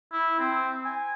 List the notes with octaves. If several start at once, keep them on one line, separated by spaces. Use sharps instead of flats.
E4
C4
G#5